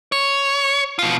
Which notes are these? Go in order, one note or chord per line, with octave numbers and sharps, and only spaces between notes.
C#5
B2 F4